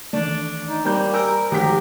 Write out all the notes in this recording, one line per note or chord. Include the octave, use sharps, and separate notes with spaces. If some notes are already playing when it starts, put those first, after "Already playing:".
D#3 E3 A3 D4
D#4
D#2 G3 A#3 C4 G6
A#4 G#5 E6 G6
D2 G#2 D#3 F3 G4 A#4 B6